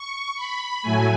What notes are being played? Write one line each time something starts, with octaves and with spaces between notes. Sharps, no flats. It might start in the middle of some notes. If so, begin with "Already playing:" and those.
Already playing: C#6
B5
A2 F#3 A3 G#5